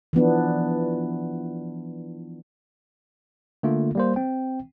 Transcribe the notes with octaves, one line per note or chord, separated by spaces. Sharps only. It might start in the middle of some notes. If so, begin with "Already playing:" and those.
E3 F3 B3 D4
D3 A3 A#3 F4
G3 A#3 C5
C4 G5